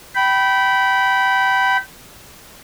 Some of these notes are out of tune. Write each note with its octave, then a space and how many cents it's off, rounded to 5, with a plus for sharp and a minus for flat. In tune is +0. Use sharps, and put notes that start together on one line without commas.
G5 -25 B5 +0